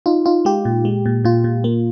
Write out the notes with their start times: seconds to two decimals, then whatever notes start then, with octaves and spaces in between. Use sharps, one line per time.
0.06 D#4 F4
0.26 D#4 F4
0.45 G#3 G4
0.65 A#2
0.85 G#3
1.06 A#2
1.25 A#2 F4
1.44 A#2
1.64 A#3